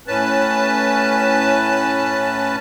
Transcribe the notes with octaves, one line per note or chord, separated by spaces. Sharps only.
A2 C#4 B4 A5